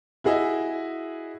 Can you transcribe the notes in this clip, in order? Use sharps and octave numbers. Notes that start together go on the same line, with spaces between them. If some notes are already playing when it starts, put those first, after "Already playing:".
E4 F#4 G#4 D#5 E5